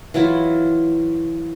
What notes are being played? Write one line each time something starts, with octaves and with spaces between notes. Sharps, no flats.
E3 F#3 E4 F4